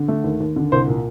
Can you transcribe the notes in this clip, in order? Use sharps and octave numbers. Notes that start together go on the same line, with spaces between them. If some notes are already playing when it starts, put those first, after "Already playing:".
Already playing: D3
A3
D#2
D#2
D3
C2 C5
A#2